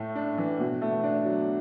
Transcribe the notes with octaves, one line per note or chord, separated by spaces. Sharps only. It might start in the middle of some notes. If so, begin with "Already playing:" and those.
Already playing: A2 A3
D4
E3
B2
A3
D4
F#3